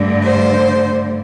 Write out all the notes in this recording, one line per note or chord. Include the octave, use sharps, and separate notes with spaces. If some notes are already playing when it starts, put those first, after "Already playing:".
Already playing: G2 D3 A3
C5